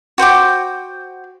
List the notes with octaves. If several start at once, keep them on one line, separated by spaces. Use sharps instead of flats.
F#4 C5 G5 D6